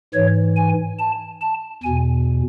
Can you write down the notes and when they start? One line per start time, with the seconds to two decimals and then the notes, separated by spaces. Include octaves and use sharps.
0.14 G#2 E3 C#5
0.56 G#5
0.99 A5
1.41 A5
1.83 E2 B2 G#5